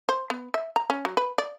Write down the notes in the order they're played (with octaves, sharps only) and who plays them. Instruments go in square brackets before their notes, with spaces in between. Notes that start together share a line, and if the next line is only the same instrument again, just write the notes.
[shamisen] C5
B3
E5
A#5
C#4
F#3
B4
D5